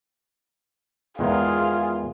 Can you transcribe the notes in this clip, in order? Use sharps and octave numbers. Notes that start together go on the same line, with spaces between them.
E2 D#3 G#3 F4 G#4